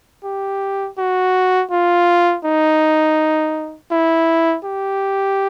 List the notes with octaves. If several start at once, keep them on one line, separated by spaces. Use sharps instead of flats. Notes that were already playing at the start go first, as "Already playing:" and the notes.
G4
F#4
F4
D#4
E4
G4